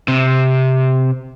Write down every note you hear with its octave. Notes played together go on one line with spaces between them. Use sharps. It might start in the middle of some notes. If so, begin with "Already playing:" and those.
C3